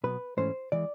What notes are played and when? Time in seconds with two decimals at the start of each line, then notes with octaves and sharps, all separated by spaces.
0.04 B2 F#3 B3 B4
0.37 G#2 E3 A3 C#4 C5
0.72 E3 G#3 D5